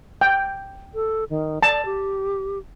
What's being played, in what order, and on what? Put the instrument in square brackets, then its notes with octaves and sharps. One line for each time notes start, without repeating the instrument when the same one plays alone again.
[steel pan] G5
[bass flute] A4
D#3
[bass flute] D5 [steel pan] A5
[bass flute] G4